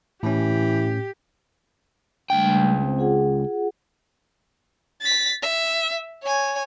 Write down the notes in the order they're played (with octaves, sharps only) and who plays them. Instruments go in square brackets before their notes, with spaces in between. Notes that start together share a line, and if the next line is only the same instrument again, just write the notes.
[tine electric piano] A2 C#4 [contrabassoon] E3 [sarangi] G4
[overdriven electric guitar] C#2 G5 [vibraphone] G3 A3 D4
[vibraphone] C4 C5
F4 G#4 F#5
[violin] A6 B6
E5
C#5 G#5